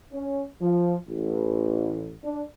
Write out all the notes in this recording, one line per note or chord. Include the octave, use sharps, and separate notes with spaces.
C#4
F3
A1
D4